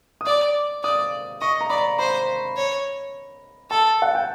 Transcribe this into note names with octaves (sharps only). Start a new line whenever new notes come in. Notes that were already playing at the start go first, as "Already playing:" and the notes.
D#6
D5 D6
D5 D#6
D#5 C#6
A#5
D5 B5
C5 B5
C#5
A4 A5
F#5
G5